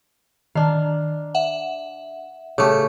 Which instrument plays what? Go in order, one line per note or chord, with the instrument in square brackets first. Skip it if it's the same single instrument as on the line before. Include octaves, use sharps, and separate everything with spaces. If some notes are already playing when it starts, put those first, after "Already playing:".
[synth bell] D#3 [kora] D4 F5
[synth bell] E5 F#5
[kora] C#3 A3 G4 [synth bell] C#6 D6